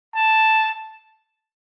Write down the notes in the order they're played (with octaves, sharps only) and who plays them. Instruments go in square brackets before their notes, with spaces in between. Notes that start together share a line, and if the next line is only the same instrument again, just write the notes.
[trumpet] A5